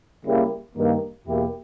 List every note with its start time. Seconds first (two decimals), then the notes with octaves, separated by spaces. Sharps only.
0.25 C#3 G3 A#3 E4 G4
0.76 G2 D#3 G3 A#3
1.26 E2 B2 A#3 E4 G4